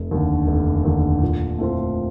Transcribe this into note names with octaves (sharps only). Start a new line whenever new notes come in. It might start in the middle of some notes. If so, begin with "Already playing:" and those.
Already playing: F1
D#2 D3
F1
D#2 D3
A#2
A3 C4 F4